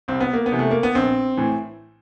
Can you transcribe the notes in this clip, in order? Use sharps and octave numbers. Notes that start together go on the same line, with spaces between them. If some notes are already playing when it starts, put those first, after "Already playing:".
C2 C4
B3
A#3
B3
C3 E3
A3
A#3
B3
A#1 C4
A2 E3